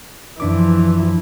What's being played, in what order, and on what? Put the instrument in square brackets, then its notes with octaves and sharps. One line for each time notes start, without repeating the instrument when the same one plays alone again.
[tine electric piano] F#2 D4 D6 [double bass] E3 F3